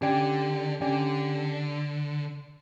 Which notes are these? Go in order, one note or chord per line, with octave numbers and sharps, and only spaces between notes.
D3 C#4 G4 D5 G5
D3 C#4 G4 D5 G5